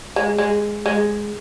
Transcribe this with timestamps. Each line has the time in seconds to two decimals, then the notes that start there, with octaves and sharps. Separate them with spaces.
0.16 G#3
0.38 G#3
0.86 G#3